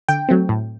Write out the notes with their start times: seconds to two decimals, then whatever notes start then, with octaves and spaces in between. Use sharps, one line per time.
0.08 D3 G5
0.29 F#3 A3 C4
0.49 A2